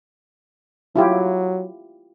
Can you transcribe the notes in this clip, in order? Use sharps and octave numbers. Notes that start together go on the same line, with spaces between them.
F#3 E4 F4 G4